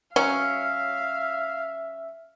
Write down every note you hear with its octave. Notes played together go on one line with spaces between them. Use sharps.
F#3 C#4 E5 F5